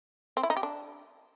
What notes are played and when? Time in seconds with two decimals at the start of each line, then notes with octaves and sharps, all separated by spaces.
0.37 C4
0.43 E4
0.50 D#4
0.57 G4
0.63 D4